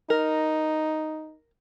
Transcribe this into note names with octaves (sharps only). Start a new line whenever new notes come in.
D#4 A#4